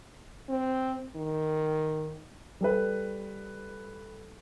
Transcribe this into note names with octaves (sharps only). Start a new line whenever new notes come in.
C4
D#3
G3 A4 B4